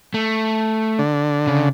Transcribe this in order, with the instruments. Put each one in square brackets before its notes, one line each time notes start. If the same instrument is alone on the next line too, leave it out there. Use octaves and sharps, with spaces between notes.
[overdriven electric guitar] A3
[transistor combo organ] D3
[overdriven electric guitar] C#3